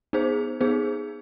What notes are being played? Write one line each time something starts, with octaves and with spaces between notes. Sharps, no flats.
B3 D#4 G#4 C5
B3 D#4 G#4 C5